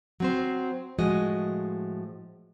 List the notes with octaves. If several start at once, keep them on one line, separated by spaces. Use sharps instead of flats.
F#3 C4 C5
A2 F3 G#3 F#4 D#5